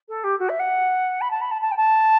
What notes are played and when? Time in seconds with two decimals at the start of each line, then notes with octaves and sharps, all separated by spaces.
0.09 A4
0.24 G4
0.39 F#4
0.49 E5
0.59 F#5
1.21 B5
1.31 A5
1.41 B5
1.51 A5
1.61 A5
1.71 G5
1.77 A5